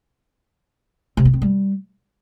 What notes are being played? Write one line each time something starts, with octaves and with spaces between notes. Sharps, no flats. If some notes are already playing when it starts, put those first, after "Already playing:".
C3
B3
C4
G3